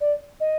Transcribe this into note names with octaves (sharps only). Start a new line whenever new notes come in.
D5
D#5